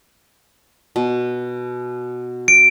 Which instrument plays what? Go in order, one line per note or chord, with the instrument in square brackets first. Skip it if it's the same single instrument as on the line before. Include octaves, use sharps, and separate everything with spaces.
[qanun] B2
[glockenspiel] D7